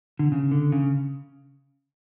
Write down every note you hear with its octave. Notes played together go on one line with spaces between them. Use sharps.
D3
C#3
D3
C#3